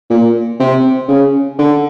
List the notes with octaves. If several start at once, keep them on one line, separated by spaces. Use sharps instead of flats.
A#2
C3
C#3
D3